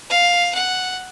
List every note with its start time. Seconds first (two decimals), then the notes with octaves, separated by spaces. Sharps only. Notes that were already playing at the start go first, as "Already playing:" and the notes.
0.10 F5
0.55 F#5